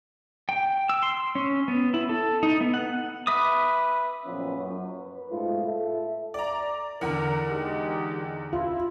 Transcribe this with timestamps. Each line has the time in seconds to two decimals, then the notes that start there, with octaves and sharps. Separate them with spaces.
0.49 G5
0.89 E6
1.03 C6
1.35 C#4
1.68 B3
1.94 E4
2.09 A4
2.43 D#4
2.61 B3
2.74 F#5
3.27 B4 E5 D6 D#6
4.25 F#1 A#2 F3 B3 C#4
4.56 F#2
4.98 B4
5.31 G#2 B2 A3 F4
5.66 A4 E5
6.34 D5 A#5
7.01 E2 D3 A#4
7.48 G#3 D#4 G4
8.53 E4 F4